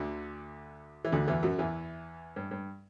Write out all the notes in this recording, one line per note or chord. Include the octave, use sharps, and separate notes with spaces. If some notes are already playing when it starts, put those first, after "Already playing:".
Already playing: D2 D3
E3
D2 D3
E2 E3
F#2 F#3
E2 E3
G2
G2